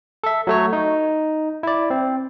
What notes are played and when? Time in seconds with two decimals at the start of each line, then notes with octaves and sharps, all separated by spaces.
0.24 A4 E5
0.47 F#3 A3 C#5
0.73 D#4
1.63 E4 D5
1.90 C4